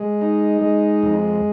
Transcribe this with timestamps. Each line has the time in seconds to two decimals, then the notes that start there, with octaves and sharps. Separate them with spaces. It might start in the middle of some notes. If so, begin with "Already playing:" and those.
Already playing: G#3
0.21 D#4
0.61 G#3
1.03 F2